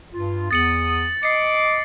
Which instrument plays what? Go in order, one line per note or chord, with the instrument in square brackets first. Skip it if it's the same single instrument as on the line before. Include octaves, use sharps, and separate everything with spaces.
[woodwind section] G2 F4
[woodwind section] E2 D#6 [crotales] A6 C#7 F#7
[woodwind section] D#5 D6 [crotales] C7 C#7